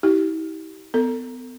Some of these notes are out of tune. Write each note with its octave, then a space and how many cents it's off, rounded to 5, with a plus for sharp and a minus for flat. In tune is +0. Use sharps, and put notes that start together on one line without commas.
E4 -45 G4 -25
B3 +25 A4 +35